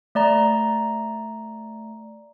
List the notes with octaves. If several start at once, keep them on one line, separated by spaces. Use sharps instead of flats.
A3 D5 A#5